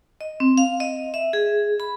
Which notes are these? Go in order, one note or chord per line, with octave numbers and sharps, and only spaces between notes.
D#5
C4
F5
D#5
E5
G#4
B5